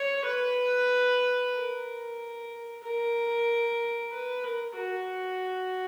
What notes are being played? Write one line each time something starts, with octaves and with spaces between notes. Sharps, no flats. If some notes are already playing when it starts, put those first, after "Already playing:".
Already playing: C#5
B4
A#4
A#4
B4
A#4
F#4